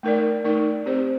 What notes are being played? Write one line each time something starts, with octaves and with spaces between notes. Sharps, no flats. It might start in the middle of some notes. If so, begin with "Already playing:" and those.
A3 D#4 A#4 D5
A3 D#4 A#4 D5
C4 G4 C5